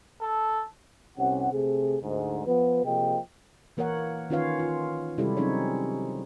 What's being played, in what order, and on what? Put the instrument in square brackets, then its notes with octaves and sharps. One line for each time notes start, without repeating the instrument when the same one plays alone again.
[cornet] A4
[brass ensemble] C2 C3 C#4 F#5
C3 A3 C4 G#4
D2 G#2
F3 B3 B4
C3 F3 A#3 G#4 D#5 G5
[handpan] E3 A#3 A#4 C#5 F#5
D#3 C#4 F4 B4 C#5 F5
F4
C3 G3 G#3 E4 G4 A4
F#3 C4 C#4 D#4 G#4 C#5